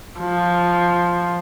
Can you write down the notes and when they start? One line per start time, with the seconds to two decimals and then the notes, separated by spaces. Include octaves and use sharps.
0.19 F3